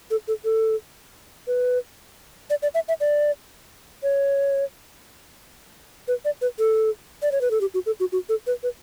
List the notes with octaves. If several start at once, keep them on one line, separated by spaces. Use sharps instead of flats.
A4
A4
A4
B4
D5
D5
E5
E5
D5
C#5
B4
D5
B4
A4
D5
C#5
B4
A4
G4
F#4
A4
F#4
F#4
A4
B4
B4